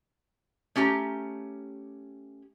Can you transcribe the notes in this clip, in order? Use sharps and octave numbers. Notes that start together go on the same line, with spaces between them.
A3 C#4 G4 A#5